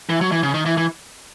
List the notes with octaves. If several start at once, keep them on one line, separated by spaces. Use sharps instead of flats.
E3
F#3
E3
C#3
D#3
E3
E3